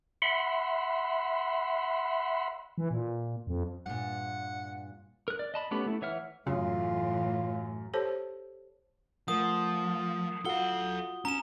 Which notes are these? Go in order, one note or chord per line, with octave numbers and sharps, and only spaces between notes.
E5 F#5 B5 C6
E3
A#2
F2
G2 A#2 F#5
A#4 F#6
D5
D#5 A5 B5
A3 B3 C#4 G4 B5
A3 E4
E3 C#5 E5 F#5 F6
F#2 A2 C#3 E3 F4
G4 A4 C5 C#5 A5
F3 A3 A#4 F#5 D#6
F4 F#4 A4 F5 F#5 G7
C#4 A#5 E7